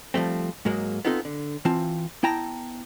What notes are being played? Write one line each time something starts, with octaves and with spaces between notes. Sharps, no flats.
F3 G3 A3 C4
G#2 F#3 G#3 A#3
B3 C4 D#4 F4 A4
D3
E3 C4 F4 A5
B3 E4 G5 A5 A#5